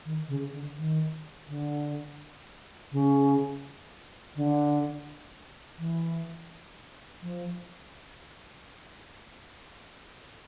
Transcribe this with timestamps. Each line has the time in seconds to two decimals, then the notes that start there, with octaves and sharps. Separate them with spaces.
0.05 D#3
0.28 C#3
0.52 D3
0.77 D#3
1.48 D3
2.92 C#3
4.36 D3
5.78 E3
7.22 F3